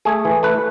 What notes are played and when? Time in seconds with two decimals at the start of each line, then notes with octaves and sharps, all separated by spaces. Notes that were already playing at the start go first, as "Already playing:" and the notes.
0.05 A3 G#4
0.25 E3
0.43 A3 B4